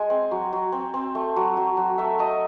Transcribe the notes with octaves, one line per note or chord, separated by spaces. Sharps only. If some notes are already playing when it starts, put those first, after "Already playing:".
Already playing: G#3 G#5
C4
F#3
F#3
C4
C4
A3
F#3
F#3
F#3
A3 E5
A3 D#5